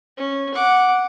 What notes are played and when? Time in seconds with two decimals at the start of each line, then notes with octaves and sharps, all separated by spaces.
0.17 C#4
0.54 F#5 D6